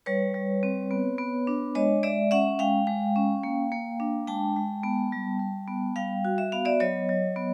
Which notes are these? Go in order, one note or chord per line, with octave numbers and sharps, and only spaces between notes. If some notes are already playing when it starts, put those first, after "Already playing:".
G3 B4 C#5
G3
C4
B3
B3
D4
G#3 C#5 D#5
G#3 D5 E5
C#4 E5 F#5
G#3 F5 G5
G#3
C#4
A#3
A#3
D4
G#3 G5 A5
G#3
B3
G3
G3
B3
G3 F5 G5
F#4
E5
B3 F5
D5 E5
F#3 C#5 D#5
F#3
B3